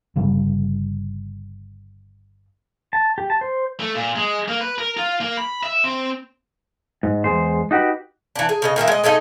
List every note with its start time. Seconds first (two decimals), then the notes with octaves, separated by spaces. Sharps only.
0.16 G1 C#3 G3
2.93 A5
3.18 G4
3.30 A5
3.41 C5
3.80 A3
3.95 A#2
4.16 G#3
4.48 A#3
4.61 B4
4.78 A#4
4.97 F4
5.21 A#3
5.37 B5
5.63 E5
5.84 C4
7.03 G#2
7.24 E2 G#3 C5
7.71 D#4 F#4 G4 B4
8.35 E3 D4
8.49 G#4
8.62 C#3 B4 D#5
8.76 A#2 D#3 A#3 E5
8.87 G#3 D#5
9.04 G#3 A3 D#4 D#5